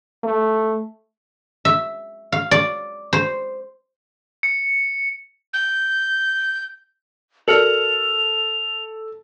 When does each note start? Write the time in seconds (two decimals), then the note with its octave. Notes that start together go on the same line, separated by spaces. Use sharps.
0.24 A3
1.65 E5
2.32 F5
2.51 D5
3.13 C5
4.43 C#7
5.53 G6
7.48 F#4 A4 A#4 D5 F6 C#7 F7 F#7